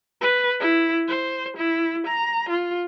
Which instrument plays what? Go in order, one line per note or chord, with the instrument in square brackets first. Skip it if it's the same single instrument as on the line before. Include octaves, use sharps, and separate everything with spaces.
[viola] B4
E4
C5
E4
A#5
F4